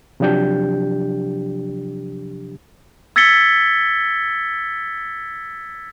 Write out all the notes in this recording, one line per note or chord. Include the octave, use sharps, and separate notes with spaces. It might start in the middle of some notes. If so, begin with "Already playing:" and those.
C3 F3 F#3 D4 G4 G6
E6 G#6 A6 B6 C#7 G7